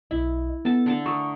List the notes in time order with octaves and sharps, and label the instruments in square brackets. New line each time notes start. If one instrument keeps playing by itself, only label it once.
[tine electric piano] B1 D#5 [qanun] E4
[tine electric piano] B3 [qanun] A4 A5
[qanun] D3 A4 A5
[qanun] A3 A#4 [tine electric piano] C#6 D#6